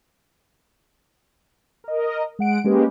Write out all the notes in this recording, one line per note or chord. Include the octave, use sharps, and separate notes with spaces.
A#4 D#5
G#3 F#5 D7
G#3 A#3 C#4 G4 B4